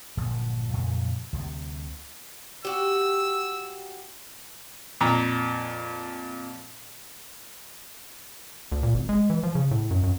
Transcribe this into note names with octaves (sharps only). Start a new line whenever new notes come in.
G1 A#2 F3 F#3
F2 A#2 C#3 F#3
D2 C3 G3
F#4 G4 E6
F2 A#2 A#5
D2
A#2
G#1
G#3
E3
F3
C#3
A2
F#2
F#2